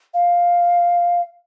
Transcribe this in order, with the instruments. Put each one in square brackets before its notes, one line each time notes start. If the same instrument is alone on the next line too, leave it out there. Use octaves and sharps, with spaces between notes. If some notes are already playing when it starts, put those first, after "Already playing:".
[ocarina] F5